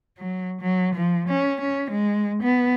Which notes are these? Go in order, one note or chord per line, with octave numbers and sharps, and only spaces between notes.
F#3
F#3
F3
C#4
C#4
G#3
B3